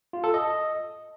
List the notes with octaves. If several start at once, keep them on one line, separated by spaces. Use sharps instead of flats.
F4
A4
D#5